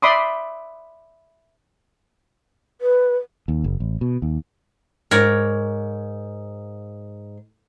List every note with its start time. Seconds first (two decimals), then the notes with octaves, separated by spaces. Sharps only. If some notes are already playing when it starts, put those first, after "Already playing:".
0.02 D5 E5 B5 C6 D6 D#6
2.81 B4
3.48 D#2
3.64 F#1
3.80 A1
4.01 B2
4.22 D#2
5.11 G#2 A#4 C#5 D5